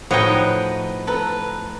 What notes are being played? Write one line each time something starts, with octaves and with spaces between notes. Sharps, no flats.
A2 F3 D#4 F#4 B4 C#5 D#5 G5
A4 B4 A#5